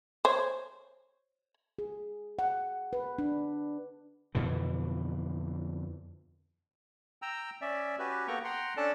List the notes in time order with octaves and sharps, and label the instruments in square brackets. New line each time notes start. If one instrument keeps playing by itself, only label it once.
[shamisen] C5 C#5
[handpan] G#4
F#5
B4
D4
[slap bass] F2 B2 D3 E3
[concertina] G5 A#5 E6
C#4 D5 E5
C#4 F#4 G4 B4
A#3 B3 A4 G5 A#5 C#6
F#5 G5 A#5 C6
C#4 D4 A4 D5 A5